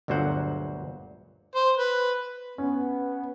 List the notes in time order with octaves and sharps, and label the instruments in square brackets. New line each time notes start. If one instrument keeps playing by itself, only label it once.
[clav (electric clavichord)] G1 D2 A#2 F#3 C5 F#5
[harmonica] C5
B4
[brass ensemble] B3 [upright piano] C#4